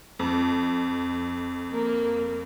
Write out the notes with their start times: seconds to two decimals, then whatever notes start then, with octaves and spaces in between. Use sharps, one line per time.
0.19 F2
1.73 A#3